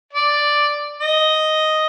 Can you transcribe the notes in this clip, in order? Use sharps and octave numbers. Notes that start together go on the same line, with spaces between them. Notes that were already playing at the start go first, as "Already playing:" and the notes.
D5
D#5